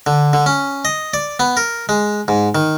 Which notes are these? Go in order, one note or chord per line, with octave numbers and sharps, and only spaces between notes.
D3
D3
C#4
D#5
D5
B3
A#4
G#3
G#2
D#3